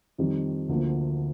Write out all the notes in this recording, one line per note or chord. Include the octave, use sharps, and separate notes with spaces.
F2 D#3 G3
D2 D3 F3 A#3